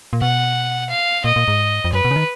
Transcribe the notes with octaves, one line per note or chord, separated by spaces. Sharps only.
A#2
B2 F#5
F5
A#2 D#5
A#2
G#2
F2
F#2 B4
B2
C#3
D#3